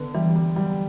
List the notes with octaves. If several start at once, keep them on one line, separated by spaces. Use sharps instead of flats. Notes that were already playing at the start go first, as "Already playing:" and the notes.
Already playing: D3 B3
E3 G3
G3
F#3 G3